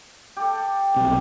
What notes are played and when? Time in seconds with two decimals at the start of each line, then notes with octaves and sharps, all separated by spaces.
0.36 G4 A4
0.97 B1 C3